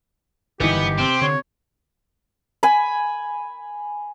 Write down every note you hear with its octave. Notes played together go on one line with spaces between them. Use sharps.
G1 A#2 D#3 E3 B3 D#4 G4
C3 C4
D3 C#5
G#5 B5